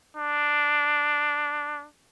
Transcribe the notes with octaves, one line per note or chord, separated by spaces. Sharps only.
D4